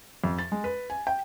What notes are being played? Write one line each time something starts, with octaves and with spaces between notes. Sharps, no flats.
F2
A6
G#3
B4
G#5
G5